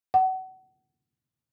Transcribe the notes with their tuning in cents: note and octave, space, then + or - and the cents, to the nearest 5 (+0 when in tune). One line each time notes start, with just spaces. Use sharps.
F#5 +30